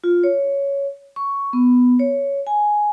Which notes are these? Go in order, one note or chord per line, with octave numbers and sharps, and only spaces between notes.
F4
C#5
C#6
B3
C#5
G#5